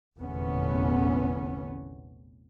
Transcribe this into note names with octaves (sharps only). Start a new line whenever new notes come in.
F1 A#1 E2 D3 B3 C#4